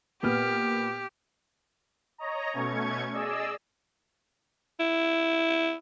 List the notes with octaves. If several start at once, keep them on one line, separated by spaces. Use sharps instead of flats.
A#2 B3 G4 F6
C#5 D#5 A#5
B2 A3 C#4 C#6 G#6
G#4 D5 D#5 E6
E4